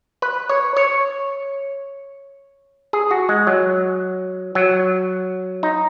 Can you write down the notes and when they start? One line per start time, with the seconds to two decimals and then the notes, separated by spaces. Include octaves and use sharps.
0.22 B4
0.49 C#5
0.77 C#5
2.93 G#4
3.11 F#4
3.29 G#3
3.47 F#3
4.55 F#3
5.63 D#4